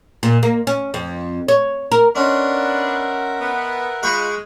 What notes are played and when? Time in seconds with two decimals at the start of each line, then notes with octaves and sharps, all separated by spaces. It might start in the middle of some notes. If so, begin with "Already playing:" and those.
0.23 A#2
0.43 A#3
0.67 C#4
0.94 F2
1.48 C#5
1.92 A#4
2.16 B3 C#4 D4 A#4 D#5 E5 F#5 C6
3.40 B3
4.03 G#3 F4 E5 B5 C#6 F#6 G6